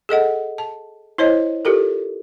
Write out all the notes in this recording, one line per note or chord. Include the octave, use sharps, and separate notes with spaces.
G#4 A4 D#5 F#5
A5
E4 C5 C#5 D#5
F4 G4 A4 A#4